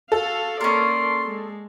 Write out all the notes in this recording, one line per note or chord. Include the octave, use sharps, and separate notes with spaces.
F#4 A4 F5
A#3 C#4 A#4 D5 C6
G#3